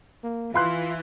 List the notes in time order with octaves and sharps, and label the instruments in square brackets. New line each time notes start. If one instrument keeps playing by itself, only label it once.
[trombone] A#3
[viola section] E3 [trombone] F4 [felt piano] F5 C6 F#6